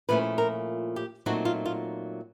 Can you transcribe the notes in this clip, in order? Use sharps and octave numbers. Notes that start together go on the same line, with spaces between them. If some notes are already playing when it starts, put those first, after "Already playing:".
A#2 F3 A3 C#4 E4 B4
A#4
G4
A#2 F#3 A3 C4 D#4 F#4
F4
F4